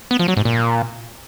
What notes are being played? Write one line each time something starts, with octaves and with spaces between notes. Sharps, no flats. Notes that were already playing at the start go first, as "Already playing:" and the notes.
B3
F3
F#3
G#2
A#2